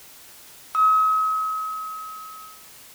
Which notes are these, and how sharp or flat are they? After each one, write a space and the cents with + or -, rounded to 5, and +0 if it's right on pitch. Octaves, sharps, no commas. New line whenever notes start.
D#6 +45